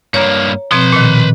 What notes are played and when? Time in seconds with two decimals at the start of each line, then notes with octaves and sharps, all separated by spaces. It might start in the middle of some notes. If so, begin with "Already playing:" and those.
0.14 G2 A#3 C#5 A#5
0.71 B2 F3 C4 B4 C6
0.93 A#2 D#3